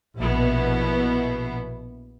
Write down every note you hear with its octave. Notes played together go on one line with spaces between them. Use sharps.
A#1 B2 B3 E4